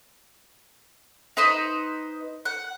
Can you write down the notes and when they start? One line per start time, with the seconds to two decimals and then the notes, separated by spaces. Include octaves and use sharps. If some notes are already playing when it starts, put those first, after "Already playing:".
1.37 D#4 B4 C5 D#5
2.45 F#5